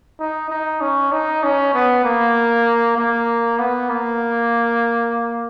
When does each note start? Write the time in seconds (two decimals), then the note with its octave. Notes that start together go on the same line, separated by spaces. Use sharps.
0.20 D#4
0.50 D#4
0.81 C#4
1.12 D#4
1.43 C#4
1.74 B3
2.04 A#3
2.97 A#3
3.59 B3
3.89 A#3